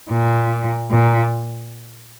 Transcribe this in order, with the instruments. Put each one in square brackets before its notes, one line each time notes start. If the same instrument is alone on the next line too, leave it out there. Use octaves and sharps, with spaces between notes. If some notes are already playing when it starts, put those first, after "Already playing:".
[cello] A#2
A#2